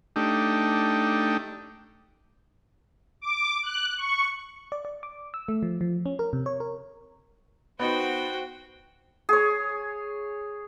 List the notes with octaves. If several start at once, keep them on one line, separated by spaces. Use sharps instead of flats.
A3 D4 D#4 G4
D6
F#6
C#6
D5
D5
D6
E6
A3
F3
F3
C#4
A#4
C3
C#5
A#4
B3 D#4 F#4 C5 G5
G#4 C#5